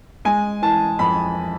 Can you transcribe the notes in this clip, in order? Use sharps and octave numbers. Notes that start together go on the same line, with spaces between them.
G#3 G#5
E3 A5
F2 B5